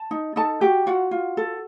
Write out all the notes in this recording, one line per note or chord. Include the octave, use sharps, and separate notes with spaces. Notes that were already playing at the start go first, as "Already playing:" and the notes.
Already playing: A5
D#4
D#4 A4 A5
F#4 G4 G5
F4 F#4 F#5
F4
A4